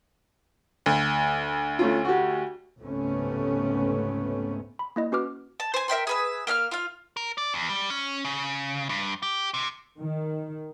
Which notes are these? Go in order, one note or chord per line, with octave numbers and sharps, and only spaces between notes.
D2
A3 C#4 F4
F#4 G4
C#2 G#2 C3 A3 B3 C#4
B5
A#3 E4 D#5
C#4 F#4 B4 D6 F6
A5
C5 G#5
A#4 E5 G5 C6
G#4 B4 E5
A#3 E5 F5 F6
F4 F5
A#4
D5
E2
G3
C#4
C#3
G2
G4
C3
D#3